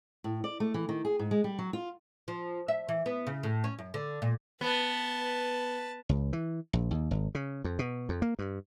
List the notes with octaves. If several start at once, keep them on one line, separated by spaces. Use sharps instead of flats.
A2
D5
A3
E3
D#3
G#4
G#2
G#3
G3
F#3
F4
F3
E5
E3
B3
C#3
A2
C#4
F#2
D3
A#2
B3 B4 A5
C#2
E3
A#1
D#2
G#1
C#3
F2
B2
F2
A#3
G2